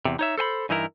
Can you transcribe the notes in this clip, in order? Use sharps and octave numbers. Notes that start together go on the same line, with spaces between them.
E2 C3
D#4 C#5 E5
A4 C5 G#5 B5
G2 E3 D#4 E4 A#4